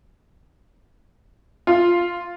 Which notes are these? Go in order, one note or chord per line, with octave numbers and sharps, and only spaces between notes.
F4